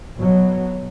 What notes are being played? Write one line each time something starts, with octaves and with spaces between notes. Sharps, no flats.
B2 F#3